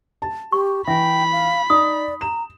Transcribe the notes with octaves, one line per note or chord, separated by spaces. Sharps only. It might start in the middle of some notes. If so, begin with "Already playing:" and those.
A5
G4 C#6
E3 E5 G5 B5
F5
D#4 D5 D#6
A#5 E7